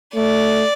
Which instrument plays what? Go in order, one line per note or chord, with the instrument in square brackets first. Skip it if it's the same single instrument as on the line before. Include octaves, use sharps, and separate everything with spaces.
[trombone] A3 [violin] D5